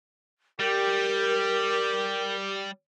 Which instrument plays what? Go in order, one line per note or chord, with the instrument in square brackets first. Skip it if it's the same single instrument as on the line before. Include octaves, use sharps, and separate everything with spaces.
[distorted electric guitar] G3 [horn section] G4 [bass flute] A#4